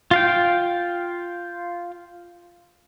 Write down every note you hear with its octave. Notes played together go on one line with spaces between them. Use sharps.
F4 F5 G5